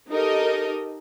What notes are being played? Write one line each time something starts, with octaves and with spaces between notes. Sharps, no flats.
D#4 G4 A4 A#4 D#5